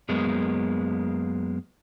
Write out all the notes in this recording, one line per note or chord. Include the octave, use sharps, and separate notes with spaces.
F#2 G#3 A#3 B3